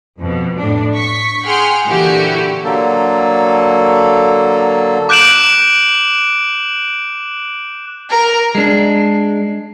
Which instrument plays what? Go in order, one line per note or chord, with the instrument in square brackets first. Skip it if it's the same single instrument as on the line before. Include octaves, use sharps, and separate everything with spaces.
[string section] F2 B2
A2 D4
C#6 B6
G#4 F#5 G5 C6 F6
A#2 D3 E3 E4 F#4 G4
[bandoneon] D3 F#3 A#3 A4
[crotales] D6 F#6 G6 D7 E7 F#7
[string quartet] A#4
[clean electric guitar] G#3 D4